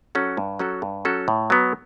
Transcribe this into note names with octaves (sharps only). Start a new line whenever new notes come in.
F#3 C#4 F#4 A4
G2
F#3 C#4 F#4 A4
G2
F#3 C#4 F#4 A4
A2
F#3 B3